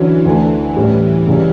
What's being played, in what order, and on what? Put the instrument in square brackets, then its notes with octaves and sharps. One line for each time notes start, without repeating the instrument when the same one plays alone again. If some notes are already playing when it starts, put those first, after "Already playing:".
Already playing: [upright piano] D3 F#3 C#4 F#4 C#5 [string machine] E3
[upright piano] D2 D3 A3 [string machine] E3
[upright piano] A2 G3 C#4
C#2 C#3 G3 C#4